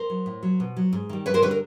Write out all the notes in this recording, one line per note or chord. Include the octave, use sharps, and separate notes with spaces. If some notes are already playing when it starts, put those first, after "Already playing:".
Already playing: A#4 C5
F#3
A2
F#3
B2
F#3
G#2
D#3 G3
G2 B4 C#5
A#4 C5
D3 G3 B4 C#5
A#4